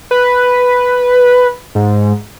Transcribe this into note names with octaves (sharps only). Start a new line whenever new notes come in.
B4
G#2